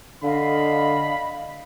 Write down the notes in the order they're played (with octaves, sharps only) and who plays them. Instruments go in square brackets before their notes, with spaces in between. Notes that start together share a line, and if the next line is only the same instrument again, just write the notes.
[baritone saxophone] D3 [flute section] D#5 F5 [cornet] B5